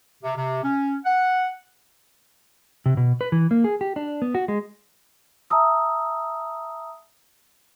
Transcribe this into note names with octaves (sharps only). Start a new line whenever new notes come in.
C3
C3
C#4
F#5
C3
B2
B4
E3
A#3
G#4
G4
D4
B3
F#4
G#3
E5 A5 A#5 D#6 E6